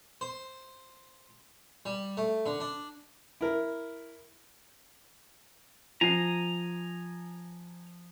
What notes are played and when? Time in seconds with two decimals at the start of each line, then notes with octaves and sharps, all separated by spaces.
0.21 C5
1.86 G3
2.17 A3
2.46 D3
2.60 D4
3.41 E4 A#4
6.01 F3 G#5 A#5 C7